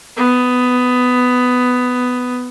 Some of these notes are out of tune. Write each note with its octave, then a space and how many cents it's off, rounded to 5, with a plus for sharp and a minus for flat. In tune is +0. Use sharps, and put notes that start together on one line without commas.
B3 +15